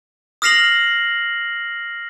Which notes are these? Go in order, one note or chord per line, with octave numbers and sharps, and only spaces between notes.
D#6 F6 A#6 C7 F7 F#7